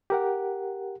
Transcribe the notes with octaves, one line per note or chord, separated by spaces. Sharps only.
G4 A#4 F#5